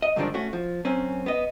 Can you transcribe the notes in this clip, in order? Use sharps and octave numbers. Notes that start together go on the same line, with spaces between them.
D#5
G2 D3 D#3 F3 G#3 D4
A3 C#4 F#4
F3
F#2 C4 C#4
B3 D#5